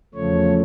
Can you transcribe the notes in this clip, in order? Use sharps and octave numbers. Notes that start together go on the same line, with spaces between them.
E2 C#3 F3 A3 C#5